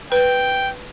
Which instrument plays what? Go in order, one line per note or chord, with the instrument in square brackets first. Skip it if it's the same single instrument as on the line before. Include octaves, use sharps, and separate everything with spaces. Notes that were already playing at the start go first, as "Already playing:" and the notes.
[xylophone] B4 G6 [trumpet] G5